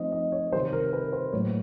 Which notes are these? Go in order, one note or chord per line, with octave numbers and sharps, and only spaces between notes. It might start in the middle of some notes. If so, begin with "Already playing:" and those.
Already playing: F3 A3 C4 D#4 D#5
D#5
C#5
C3 D#3 G3 C5
A#4
B4
C5
A2 F#3 A#3 C#5